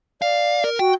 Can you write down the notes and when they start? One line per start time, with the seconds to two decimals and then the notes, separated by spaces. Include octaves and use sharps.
0.22 D5 F5
0.64 A#4
0.79 F#4 G5